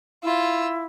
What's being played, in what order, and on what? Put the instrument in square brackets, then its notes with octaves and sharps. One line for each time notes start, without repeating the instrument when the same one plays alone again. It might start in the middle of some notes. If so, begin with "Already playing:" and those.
[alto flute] E4 [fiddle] F4 E6